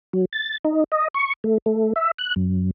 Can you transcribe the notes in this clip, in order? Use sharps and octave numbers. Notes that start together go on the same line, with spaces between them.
F#3
A6
D#4
D#5
C#6
A3
A3
E5
F#6
F#2